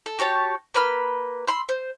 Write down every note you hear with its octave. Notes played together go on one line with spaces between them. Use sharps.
A4
F#4 G4 C#5 A5
A#3 B4 B5 F6
B5 C6 E6
C5